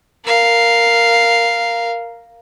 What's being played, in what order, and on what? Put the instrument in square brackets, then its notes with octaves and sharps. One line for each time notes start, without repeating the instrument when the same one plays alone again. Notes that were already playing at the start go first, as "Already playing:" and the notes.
[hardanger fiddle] A#4 F5